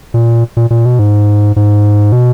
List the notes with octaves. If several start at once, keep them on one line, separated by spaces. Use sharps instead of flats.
A#2
A#2
A#2
B2
G#2
G#2
B2